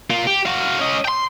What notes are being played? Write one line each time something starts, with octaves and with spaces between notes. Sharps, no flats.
A#3 F4
G4
F#4 F5
C#4 D#5
G5 C6